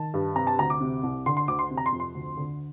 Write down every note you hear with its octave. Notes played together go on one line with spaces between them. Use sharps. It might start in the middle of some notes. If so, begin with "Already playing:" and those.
Already playing: D#3 A5
G2
C3 A#5
A5
D2 A#5
D6
C3
C2
D3 C6
C6
D2 D6
C6
C3
A#5
C6
F2
C6
D2
D3